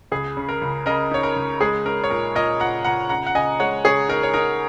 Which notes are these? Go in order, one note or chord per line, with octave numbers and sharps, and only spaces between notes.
C#2 G#4
C#3
A#4
C#2
C#3 A#4 D#5
D#4 C#5
A#4
C#2
G#3 G#4
C#4 A#4
C#5
A#2 A#4
A#2 A#4 D#5
A#2 F#5 A#5
A#2 F#5 A#5
C#3 F#5 A#5
F#5
C#3 D#5 G#5
G#3 C#5 F#5
C#3 G#4 C#5
D#4 A#4
C#5
D#4 A#4